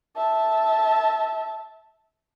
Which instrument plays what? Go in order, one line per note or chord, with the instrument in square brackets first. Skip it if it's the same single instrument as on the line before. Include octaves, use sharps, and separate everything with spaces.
[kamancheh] E5 A5